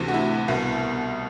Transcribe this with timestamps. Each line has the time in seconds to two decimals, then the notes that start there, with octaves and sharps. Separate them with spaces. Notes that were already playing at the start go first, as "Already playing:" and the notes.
Already playing: D2 C3 E3
0.08 F#4
0.14 E4
0.48 C2 B2